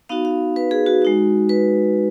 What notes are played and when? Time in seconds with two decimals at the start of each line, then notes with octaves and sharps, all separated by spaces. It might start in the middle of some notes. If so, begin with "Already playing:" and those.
0.09 B3 D#4 F#4 F5
0.25 F5
0.56 B4
0.71 G#4
0.86 F#4
1.02 G#3 D#4 F#4
1.49 B4